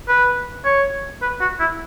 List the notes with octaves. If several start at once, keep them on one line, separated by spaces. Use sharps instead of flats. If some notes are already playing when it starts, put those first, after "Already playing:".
B4
C#5
B4
F#4
E4